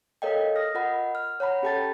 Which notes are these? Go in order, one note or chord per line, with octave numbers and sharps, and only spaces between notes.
A4 A#4 C#5 D#5 F5 G5
D#6 F6 A#6
F4 A#4 D#5 F#5 B5
F6
C#5 F#5 A#5 B5
C#4 G4 A4 G5 A5 A6